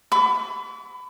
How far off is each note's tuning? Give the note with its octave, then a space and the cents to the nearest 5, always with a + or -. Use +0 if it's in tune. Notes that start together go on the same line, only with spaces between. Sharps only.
B5 +25 D6 -45